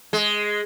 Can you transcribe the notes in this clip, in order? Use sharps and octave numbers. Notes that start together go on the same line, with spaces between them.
G#3